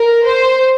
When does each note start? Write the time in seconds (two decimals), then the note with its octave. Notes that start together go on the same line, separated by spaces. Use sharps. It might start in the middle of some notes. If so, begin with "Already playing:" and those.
Already playing: A#4
0.26 C5